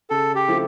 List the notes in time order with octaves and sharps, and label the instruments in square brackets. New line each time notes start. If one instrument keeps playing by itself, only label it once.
[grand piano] C#3 [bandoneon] A4
[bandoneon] G4
[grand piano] F3 A3 C4 E4